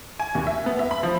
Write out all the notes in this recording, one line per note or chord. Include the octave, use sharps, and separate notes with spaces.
G#5
D#2
E5
B3
E5
B5
F3